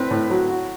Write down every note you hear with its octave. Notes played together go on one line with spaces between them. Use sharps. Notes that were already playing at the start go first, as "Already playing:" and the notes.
Already playing: A2 C4 B4
A2
F#3
F#4